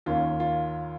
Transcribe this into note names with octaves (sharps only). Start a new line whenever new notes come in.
D#2 D#3 A#3 C#4 F4
F4